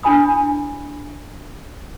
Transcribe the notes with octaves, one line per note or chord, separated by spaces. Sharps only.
D4 E4 G#5 B5 D#6